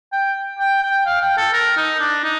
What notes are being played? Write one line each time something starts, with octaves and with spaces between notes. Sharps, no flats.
G5
G5
G5
F5
G5
A4
A#4
D#4
D4
D#4